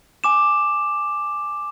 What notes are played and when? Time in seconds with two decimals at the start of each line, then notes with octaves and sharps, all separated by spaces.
0.24 G#5 D6 E7